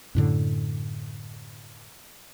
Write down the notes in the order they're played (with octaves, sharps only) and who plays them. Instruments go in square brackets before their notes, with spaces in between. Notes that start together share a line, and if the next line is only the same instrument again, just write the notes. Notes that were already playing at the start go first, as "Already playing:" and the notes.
[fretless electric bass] F#2 A2 D3